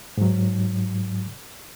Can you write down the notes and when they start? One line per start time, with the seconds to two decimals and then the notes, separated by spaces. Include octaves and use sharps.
0.17 G#2 F#3